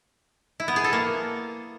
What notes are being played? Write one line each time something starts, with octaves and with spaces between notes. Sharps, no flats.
E4
B3
G#4
A4
A#3